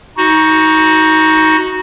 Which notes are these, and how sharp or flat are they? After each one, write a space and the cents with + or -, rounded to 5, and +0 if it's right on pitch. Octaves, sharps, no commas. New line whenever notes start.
D#4 +25 F#4 +0